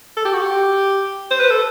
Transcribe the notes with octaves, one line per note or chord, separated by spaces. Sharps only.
A4
G4
F#4
G4
C5
B4
A4